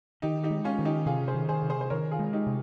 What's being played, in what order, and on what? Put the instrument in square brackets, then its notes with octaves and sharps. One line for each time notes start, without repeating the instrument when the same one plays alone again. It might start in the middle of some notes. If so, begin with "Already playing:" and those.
[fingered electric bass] D#3 [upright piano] D#4 G4
[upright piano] D#4 G4
[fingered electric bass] G#3
[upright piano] C#4 F4
[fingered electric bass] D#3
[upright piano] D#4 G4
[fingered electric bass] C3 [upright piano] F4 G#4
[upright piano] G#4 C5
[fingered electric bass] D#3
[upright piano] G#4 C5
[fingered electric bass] C3
[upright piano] G#4 C5
C5
[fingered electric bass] D#3 [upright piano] A#4 C#5
[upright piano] F4 G#4
[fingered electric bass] G#3
[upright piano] D#4 G4
[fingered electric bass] C3